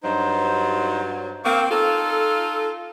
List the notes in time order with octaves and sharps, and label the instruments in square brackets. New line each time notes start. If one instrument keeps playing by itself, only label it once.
[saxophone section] G2 F#3 [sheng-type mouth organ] D#4 C5
[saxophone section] A#3 C4 [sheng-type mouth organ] F5 C#6 D6
[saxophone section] D#4 F4 A4 [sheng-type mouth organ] F6